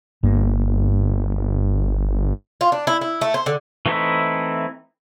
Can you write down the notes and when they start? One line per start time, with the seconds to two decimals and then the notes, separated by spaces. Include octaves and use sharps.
0.23 G1 G2 A#3
2.61 F4
2.72 D4
2.87 E4
3.01 E4
3.21 A3
3.34 C5
3.46 D3
3.86 E3 A3 C4 D#4 E4